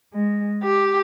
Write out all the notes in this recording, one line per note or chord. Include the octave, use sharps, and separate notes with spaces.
G#3
G4